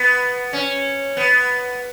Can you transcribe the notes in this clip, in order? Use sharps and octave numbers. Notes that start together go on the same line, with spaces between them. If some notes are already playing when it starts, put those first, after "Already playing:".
Already playing: B3
C#4
B3